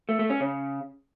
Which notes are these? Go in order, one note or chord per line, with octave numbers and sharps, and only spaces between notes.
A3
A3
C#4
C#3